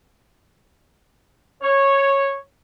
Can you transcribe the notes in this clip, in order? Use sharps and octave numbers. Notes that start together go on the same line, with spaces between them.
C#5